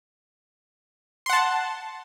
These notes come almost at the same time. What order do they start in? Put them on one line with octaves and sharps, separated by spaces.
C6 F#5 A5